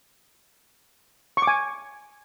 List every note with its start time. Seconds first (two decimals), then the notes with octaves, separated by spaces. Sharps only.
1.37 C#6
1.42 D6
1.47 G#5